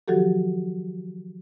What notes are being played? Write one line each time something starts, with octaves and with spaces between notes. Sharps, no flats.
D#3 F3 F#3 F#4 G4 A4